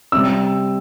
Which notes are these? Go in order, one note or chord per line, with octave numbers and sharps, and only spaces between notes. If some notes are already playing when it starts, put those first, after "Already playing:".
C3 G3 E6